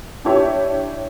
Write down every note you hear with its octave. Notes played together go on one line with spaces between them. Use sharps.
D4 E4 G4 C#5 E5 C#6